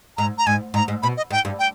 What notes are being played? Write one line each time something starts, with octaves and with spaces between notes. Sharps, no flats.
G#2 A#5
A#5
G#2 G#5
G#2 A#5
G#2
B2 B5
D#5
G#2 G5
G2
G5